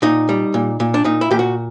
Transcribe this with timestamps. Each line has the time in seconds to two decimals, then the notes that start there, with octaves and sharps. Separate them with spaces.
0.02 A#2 D#4
0.29 G3
0.54 A#2
0.80 A#2
0.94 D4
1.04 A#2 D#4
1.21 E4
1.31 A#2 G4
1.39 F#4